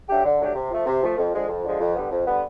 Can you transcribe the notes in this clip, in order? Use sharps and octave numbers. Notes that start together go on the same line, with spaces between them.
F#3 A3 D4 G4
D3
F#3 A3 D4 G4
C3
F3 A3
C3
F3 A3
F2
D3 F3 G#3
F2
D3 F3 G#3
F2
D3 G3 B3
F2
D3 G3 B3